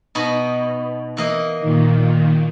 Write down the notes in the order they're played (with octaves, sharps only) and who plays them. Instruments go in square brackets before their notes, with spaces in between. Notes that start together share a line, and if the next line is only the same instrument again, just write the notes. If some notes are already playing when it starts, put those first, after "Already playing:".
[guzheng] B2 B3 D#4
E3 A#3 D#5
[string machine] A#2 D#3